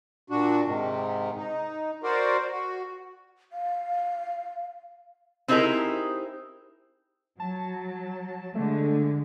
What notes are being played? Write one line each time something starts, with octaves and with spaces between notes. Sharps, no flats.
A#2 D4 F#4
G#2 C3 D#3
D#4
F#4 A#4 C5 D5
F#4
F5
C4 D#4 E4 G4 G#4 A#4
F#3 A5
D3 G#3 A3